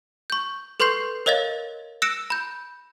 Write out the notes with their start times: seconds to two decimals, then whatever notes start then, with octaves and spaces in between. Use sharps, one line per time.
0.30 C#6 G6
0.80 A4 B4 C6 C#6 G6 C7
1.26 A#4 C#5 D#5 F5 A6
2.02 E6 F#6 A#6 C#7 D7 E7
2.30 B5 G6